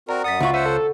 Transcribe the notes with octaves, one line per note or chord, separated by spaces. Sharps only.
C4 F#4 A#4 D5 A#5
F#2 F#5 D#6 A6 B6
C#2 F4 F#4 E5 F#5 B5 C#6
C5 E5 F#5 D#7
A4